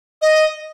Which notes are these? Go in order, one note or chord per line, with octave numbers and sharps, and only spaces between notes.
D#5